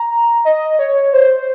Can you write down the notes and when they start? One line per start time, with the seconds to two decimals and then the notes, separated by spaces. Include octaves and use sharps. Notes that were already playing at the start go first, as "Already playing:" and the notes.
Already playing: A#5
0.45 D#5
0.79 C#5
1.13 C5